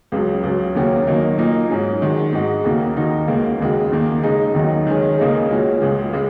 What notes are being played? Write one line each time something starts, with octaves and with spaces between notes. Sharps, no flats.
C#2 C#3 F#3
C#2 C#3 F#3 C#4
D#2 C#3 A#3 C#4 F#4
D#3 F#3 A#3 D#4
A#2 A#3 D#4
G#2 F#3 C#4 G#4
D#3 G#3 F#4
G#2 G#3 D#4 F#4
D#2 C#3 A#3 F#4
D#2 D#3 A#3 D#4 F#4
C#2 C#3 A#3
D#2 C#3 G#3 F#4
D#2 D#3 A#3
C#3 G#3 D#4 G#4
D#2 D#3 F#3 D#4 F#4
D#3 G#3 C#4 G#4
C#2 C#3 A#3 D#4 G#4
A#2 G#3 C#4 F#4
C#2 C#3 G#3
C#3 G#3